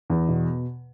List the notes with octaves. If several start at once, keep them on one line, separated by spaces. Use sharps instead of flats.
E2
B2